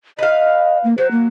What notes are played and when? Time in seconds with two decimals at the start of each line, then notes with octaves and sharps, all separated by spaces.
0.19 B4 D#5 F5
0.84 A#3
0.98 F#3 C5
1.11 A#3